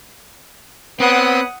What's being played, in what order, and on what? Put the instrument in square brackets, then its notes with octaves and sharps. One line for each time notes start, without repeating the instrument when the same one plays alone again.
[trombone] B3 [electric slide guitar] C4 [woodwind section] B4 C#5 B5 [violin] F#5 D#6